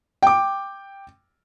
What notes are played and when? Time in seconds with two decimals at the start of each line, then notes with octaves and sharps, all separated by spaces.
0.22 G5 D6